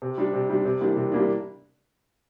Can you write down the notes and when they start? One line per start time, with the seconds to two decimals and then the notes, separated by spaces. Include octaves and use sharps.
0.02 C3
0.18 G3 D4
0.33 C3
0.49 G3 D4
0.65 C3
0.81 E3 G3 A#3 D4
0.96 C3
1.12 E3 G3 A#3 D4